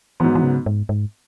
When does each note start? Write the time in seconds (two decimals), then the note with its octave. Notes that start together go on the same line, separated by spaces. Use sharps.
0.20 G#2 E3 F#3 B3
0.35 E3
0.43 C#3
0.66 G#2
0.89 G#2